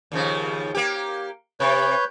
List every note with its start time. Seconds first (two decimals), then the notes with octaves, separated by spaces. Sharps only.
0.12 D#2 C#3 F3
0.75 A#3 G4
1.60 C3 B4 C#5 G6